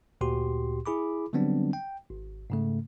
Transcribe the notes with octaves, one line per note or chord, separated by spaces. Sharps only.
D2 A#2 F#4 G4 C6
E4 G#4 B5 D6
D3 F#3 G3 B3 C4 D4
G5
G#1
G#2 C#3 A3